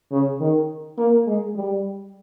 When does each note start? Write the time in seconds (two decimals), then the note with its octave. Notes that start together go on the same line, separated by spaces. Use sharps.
0.12 C#3
0.41 D#3
0.98 A#3
1.27 G#3
1.56 G3